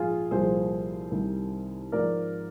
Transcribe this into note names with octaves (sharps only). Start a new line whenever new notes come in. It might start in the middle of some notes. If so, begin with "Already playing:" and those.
Already playing: A#1 G#2 F3 F4 G#4
C2 A#2 F3 G#4 C5
C2 C3 D#3
G#1 G#2 F3 A#4 D5